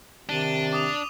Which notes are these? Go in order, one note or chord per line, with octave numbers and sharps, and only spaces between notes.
C3 D#3 D4 D#7 G7
D6 D#6 F7